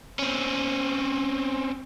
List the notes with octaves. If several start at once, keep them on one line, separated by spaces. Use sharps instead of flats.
C4 C#4